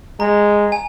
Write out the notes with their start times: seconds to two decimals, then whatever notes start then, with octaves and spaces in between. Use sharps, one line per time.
0.20 G#3 A#5
0.72 G#5